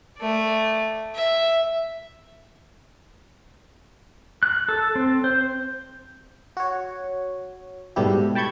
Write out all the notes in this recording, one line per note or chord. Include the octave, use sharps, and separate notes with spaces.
A3 D5
E5
F#6
A4
C4
C5
F#4 C#5
G#2 B2 G3 A3 E4 G4
G5 A5 B5 C#6 G6 G#6